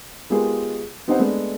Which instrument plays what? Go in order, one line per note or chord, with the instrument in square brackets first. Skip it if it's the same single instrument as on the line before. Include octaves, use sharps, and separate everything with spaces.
[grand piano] G#3 B3 F4 G4 G#4 A#4
B3 C4 D#4 G4 C5 F#5
G#3 A3 B3 D4